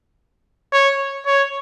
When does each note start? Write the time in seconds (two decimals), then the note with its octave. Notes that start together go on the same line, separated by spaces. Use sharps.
0.73 C#5
1.27 C#5